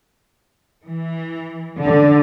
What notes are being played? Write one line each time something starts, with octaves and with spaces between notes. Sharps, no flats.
E3
D3